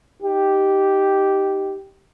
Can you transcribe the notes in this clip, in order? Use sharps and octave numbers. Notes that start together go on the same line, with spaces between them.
D#4 G4